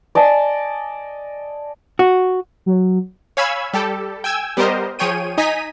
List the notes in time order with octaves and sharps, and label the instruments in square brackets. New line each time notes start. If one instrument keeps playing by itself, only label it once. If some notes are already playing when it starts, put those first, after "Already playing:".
[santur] D5 D#5 G#5 A5
[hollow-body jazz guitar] F#4
[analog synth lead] F#3
[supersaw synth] C#5 F5 G#5 B5 E6 G#6
G3 G4 A4
G5 G#5 E6 G#6
G3 B3 G4 A#4 C5 D#5
F3 G#4 C#5 G5 D#7
D#4 D#5 G#5 A#5 B6 D#7